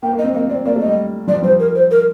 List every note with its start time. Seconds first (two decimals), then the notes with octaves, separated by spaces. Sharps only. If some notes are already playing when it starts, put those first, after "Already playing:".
0.03 A#3 G5
0.13 A#3
0.19 D#5
0.24 C4
0.34 A#3 D#5
0.50 C4 D5
0.65 A#3 D5
0.76 A3
0.81 D#5
0.86 G3
1.27 F3 D5
1.34 G3
1.42 F3 C5
1.59 A#4
1.75 C5
1.91 A#4